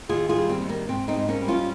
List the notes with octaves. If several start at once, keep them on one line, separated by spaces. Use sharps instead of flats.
D#2 F4 G#4
F4 G#4
G3
C4
D#2
A#3
G#2 C4
C4 D#4
G#2
A#3 C#4
G3
C#4 F4